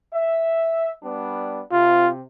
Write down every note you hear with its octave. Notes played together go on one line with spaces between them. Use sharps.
E5
G3 B3 D4
C3 F4